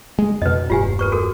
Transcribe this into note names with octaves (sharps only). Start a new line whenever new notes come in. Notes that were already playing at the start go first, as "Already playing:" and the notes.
G#3
F2 B2 B4 D#5
E1 G2 F4 G4 G#5
A#4 B4 C#6
F#4 A4 A#4